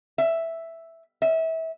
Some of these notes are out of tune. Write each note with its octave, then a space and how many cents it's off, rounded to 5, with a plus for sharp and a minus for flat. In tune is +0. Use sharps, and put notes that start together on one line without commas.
E5 +0
E5 -30